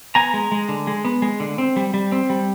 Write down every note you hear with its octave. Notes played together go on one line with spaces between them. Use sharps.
B3 G#5 A#5
G#3
G#3
D3
G#3
B3
G#3
D3
C4
G3
G3
C4
G3